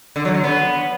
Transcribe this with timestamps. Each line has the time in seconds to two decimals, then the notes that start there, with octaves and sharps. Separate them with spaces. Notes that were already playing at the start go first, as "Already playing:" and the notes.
0.16 D3
0.25 F#3
0.34 D3
0.44 B3